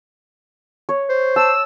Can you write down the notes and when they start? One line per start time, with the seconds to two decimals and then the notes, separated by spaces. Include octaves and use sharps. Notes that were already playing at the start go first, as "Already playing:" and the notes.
0.89 C#5
1.09 C5
1.36 A5 E6